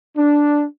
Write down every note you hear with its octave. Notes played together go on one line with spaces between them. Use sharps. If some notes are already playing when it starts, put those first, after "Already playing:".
D4